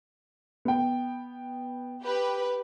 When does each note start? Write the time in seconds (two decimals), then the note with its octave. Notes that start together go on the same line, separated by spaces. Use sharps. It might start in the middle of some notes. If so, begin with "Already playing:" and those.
0.65 B3 G5
2.02 G4 B4